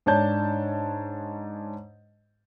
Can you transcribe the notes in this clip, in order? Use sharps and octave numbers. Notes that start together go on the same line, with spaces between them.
G#2 D4 C#5 A5 G6